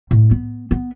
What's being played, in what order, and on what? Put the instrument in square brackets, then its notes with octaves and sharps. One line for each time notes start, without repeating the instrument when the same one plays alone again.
[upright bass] A2
B3
B3